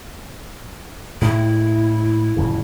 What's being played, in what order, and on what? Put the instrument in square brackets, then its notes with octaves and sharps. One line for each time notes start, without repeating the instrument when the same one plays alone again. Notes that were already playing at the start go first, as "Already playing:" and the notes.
[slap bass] A2 G#3 [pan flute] E4
[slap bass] D1 F2 C#3